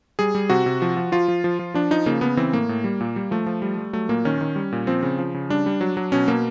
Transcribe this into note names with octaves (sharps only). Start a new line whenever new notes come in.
G3 G#4
G3
C3 F#4
C3
F3
F3
F3 F4
F3
F3
F3
F3 D4
F3 D#4
C#3 A#3
C#3 B3
E3 C4
A2 A#3
A2
G3
A#2
G3
F3 A3
F3
G3
G3
F#3 A3
A#2 A#3
D#3 C#4
D#3
G3
A#2
F3 C4
C#3
F3
C#3
G3 D4
G3
F#3
F#3
B2 C#4
B2 A#3